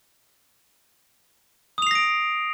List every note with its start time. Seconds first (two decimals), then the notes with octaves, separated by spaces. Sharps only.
1.78 D#6
1.82 F7
1.87 C7
1.91 A#6
1.95 D7